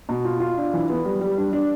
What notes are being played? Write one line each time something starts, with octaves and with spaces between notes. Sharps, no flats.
B2
F4
F4
D4
E3
B3
G3
G3
D4
D4